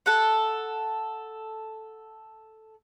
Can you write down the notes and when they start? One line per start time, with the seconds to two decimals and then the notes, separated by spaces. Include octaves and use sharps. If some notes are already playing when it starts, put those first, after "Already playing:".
0.06 A4 F#5